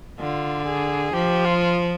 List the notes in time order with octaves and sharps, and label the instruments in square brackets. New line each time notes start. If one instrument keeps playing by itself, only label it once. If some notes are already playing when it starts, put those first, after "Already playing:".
[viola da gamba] D3 [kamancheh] F4
[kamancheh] G#4
[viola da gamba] F3 [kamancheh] G4
[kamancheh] F4